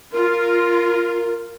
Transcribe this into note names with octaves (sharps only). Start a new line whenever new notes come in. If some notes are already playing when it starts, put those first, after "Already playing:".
F4 A#4